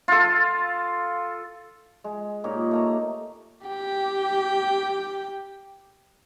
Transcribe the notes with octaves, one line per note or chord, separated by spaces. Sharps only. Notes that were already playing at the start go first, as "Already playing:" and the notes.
F4 A4
G#3
A#2 D#4 G4 C#5
A3 A#3 A#5
G4 G5